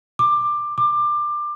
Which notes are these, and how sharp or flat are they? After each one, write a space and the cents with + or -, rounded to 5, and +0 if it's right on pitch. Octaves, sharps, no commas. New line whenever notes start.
D6 +15
D6 +20